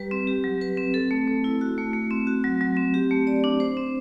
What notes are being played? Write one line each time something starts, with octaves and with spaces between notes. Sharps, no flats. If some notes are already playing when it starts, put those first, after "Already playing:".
Already playing: G3 G4 B4
C4
G4
F#3
B4
C4
A4
A3
A3
E4
F#4
A3
A3
C4
F#4
F#3
F#3
C4
G4
A3
D5
D4
C5
C4